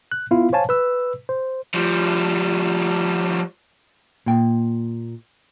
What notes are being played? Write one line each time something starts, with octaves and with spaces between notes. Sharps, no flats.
F#6
B3 E4 F4 F5
C5 C#5 F5 G#5 A5
B4 E6
C5
F3 G3
A#2 G5